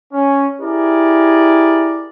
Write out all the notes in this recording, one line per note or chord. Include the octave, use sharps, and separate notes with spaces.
C#4
E4 G4 G#4 A#4 D5